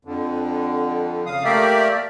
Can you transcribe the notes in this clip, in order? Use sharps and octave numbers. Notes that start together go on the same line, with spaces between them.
F2 D3
C#3 F5 D#6
A3 A#3 G4 A#4 D5 E5